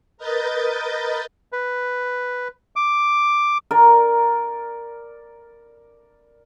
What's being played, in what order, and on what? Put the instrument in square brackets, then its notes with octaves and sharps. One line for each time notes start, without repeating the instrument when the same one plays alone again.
[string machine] A#4 B4 D#5 G6 A6
[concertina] B4
D6
[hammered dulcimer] A#4 D5